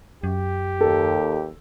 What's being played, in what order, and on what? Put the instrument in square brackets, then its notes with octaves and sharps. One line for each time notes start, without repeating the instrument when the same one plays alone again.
[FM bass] F#2 [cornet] G4
[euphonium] D#2 [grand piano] A4